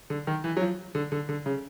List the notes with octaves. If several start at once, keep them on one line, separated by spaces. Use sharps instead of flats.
D3
D#3
E3
F#3
F3
D3
D3
D3
C#3